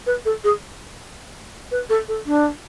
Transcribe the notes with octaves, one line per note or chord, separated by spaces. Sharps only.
B4
A4
G#4
B4
A4
A4
D4